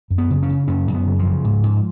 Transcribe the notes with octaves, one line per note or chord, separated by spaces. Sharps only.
F#2
B3
C#3
C#4
C#3
F#2 C#4
F#2
B3
C#3
F3
C#3
G#2
G#2